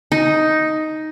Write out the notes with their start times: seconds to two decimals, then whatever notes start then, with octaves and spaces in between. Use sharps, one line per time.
0.12 D#4